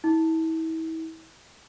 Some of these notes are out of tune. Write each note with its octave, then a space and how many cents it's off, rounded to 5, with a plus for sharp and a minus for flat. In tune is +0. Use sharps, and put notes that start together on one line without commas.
E4 -35